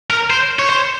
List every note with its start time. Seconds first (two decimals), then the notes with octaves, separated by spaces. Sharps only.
0.10 A#4
0.30 C5
0.59 C#5
0.69 C5